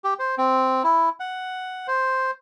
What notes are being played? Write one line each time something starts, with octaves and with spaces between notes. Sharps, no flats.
G4
C5
C4
E4
F#5
C5